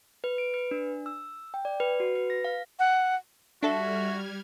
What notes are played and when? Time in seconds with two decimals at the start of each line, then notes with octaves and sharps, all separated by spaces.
0.24 B4
0.38 D7
0.54 B4
0.71 D4
1.06 E6
1.54 G5
1.65 D5
1.80 B4
2.00 F#4
2.15 B4
2.30 A#6
2.45 F5
2.79 F#5
3.63 G3 D4 F#4 A4 E5 F6 G#6